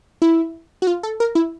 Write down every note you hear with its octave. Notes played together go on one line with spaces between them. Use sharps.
E4
F#4
F4
A4
A#4
E4